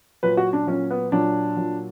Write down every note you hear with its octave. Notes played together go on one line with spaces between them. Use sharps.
A#2 F#3 B4
F#4
D4
A#2 F#3 C#4
B3
A#2 F#3 D4
A#2 F#3